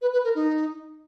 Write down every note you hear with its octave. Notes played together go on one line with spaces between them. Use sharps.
B4
B4
A#4
D#4